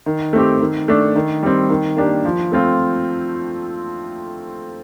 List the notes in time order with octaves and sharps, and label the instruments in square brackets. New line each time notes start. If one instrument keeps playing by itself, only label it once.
[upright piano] D#3
A3 C4 G4
D#3
A3 D4
D#3
G3 C4
D#3
A#3 D4 G4
F3
A3 C4 F4